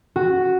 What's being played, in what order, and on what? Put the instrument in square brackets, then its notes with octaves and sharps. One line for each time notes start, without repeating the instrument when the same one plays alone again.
[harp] F#4